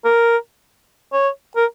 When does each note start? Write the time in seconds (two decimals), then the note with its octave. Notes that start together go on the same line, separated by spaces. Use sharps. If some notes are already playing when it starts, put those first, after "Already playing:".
0.05 A#4
1.13 C#5
1.56 A#4